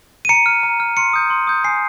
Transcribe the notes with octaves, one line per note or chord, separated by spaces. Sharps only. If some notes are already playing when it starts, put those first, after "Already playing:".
D#7
A#5 C#7
F6
A#5
F6
C6 C#7
D#6 G6
C6
D#6 G6
G#5 C7